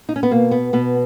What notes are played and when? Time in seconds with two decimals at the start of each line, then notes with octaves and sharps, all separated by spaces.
0.09 D#4
0.16 C#4
0.23 B3
0.31 B2 A#3
0.51 B3
0.73 B2 B3